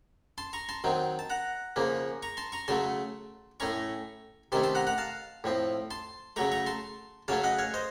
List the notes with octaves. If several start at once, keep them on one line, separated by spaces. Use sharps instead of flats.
A5 C6
A#5 C#6
A5 C6
D#3 F#3 C4
A5
F#5 A#5
C#3 F3 A#3 C#4
A#5 C#6
A5 C6
A#5 C#6
C#3 F#3 A3 A5 C6
A2 A3 C#4 A#5 C#6
C3 D#3 A3 C#4 A5 C6
A5 C6
F#5 A#5
F#5 A#5
F5 A5
A2 F3 C4
A5 C6
C#3 F#3 A3 A#5 C#6
A#5 C#6
A5 C6
C#3 F#3 A3 C#4 F5 A5
D#5 F#5
C#5 F5
C5 D#5